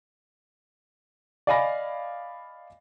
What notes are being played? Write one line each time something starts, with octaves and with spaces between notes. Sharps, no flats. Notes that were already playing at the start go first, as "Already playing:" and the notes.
D5 D#5 F5 G#5 B5 A#6